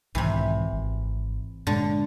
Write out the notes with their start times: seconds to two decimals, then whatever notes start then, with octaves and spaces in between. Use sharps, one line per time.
0.15 B1 G#2 C3 D#3 E3
0.73 G#1
1.67 G2 A#2 D3 G#3